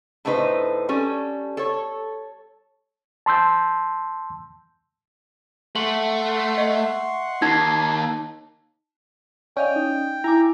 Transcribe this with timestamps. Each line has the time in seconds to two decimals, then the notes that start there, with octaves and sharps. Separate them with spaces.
0.25 A2 D3 A3 D#4 B4 C5
0.89 G3 C#4 A4
1.57 A4 C#5
3.26 A5 C6 E6 G6
5.76 A3 F#5 C6 C#6 F#7
6.58 D#5 E5
7.42 D#2 D#4 A5 G#6 C7
9.57 C#4 D5 D#5 F5 G5
9.76 D#4
10.24 E4 G#5 A#5 D6